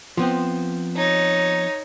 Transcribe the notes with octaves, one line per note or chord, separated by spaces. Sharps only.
F3 B3 C4
D#4 C#5